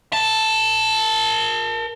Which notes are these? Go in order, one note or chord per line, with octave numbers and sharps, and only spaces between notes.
A#4 A5